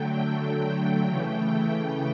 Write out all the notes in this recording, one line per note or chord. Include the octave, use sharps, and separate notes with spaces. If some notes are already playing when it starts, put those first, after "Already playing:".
Already playing: D3 F#3 A3 G5
G5
C#3 E3 A3 G5